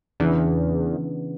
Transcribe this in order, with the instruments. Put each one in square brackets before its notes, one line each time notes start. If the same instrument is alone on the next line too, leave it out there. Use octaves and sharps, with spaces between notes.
[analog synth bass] E2 [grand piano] C#3 E3 B3 D4